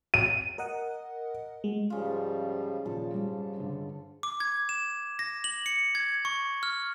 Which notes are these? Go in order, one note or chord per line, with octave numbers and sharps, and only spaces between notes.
D#7
A#4 D#5 F#5
G#3
G#2 C#3 F3 G3 F4
A#2 D#3 F3 A4
G#2 G3
G2 D3
D6
G#6
E7
A#6
F#7
C#7
G#6
C#6
F6